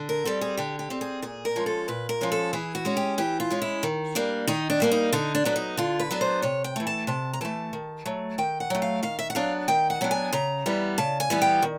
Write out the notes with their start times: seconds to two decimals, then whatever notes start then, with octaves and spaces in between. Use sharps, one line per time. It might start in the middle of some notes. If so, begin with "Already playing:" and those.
Already playing: D3
0.09 A#4
0.25 G3 C4 A4
0.41 G#4
0.57 D3 G4
0.79 G4
0.90 G3 C4
1.01 G#4
1.22 A#2 G#4
1.45 A#4
1.56 F3 G#3 C#4
1.66 A4
1.88 A#2 B4
2.09 A#4
2.21 F3 G#3 C#4
2.32 A4
2.53 E3 G#4
2.75 F#4
2.85 G#3 C#4
2.97 G4
3.18 E3 G4
3.40 F4
3.51 G#3 C#4
3.62 E4
3.83 D#3
4.15 G3 A#3 D4
4.47 D#3 D#4
4.70 D4
4.80 G3 A#3 D4
4.92 D#4
5.13 D3 D#4
5.35 D4
5.45 F#3 B3 D4
5.56 D#4
5.77 D3 F4
6.00 B4
6.11 F#3 B3 D4
6.21 C5
6.42 C3 C#5
6.64 G5
6.76 E3 A3
6.87 A5
7.07 C3 A5
7.33 A#5
7.41 E3 A3 A5
7.73 D#3
8.06 F#3 A3
8.38 D#3 G5
8.60 F#5
8.70 F#3 A3
8.82 F5
9.03 D#3 F5
9.19 E5
9.30 F#5
9.35 F#3 B3 D4 F5
9.68 D#3 G5
9.90 F#5
10.01 F#3 B3 D4
10.11 G#5
10.33 C#3 A#5
10.66 E3 G3 B3
10.98 C#3 A5
11.20 G#5
11.30 E3 G3 B3
11.42 G5
11.62 D#3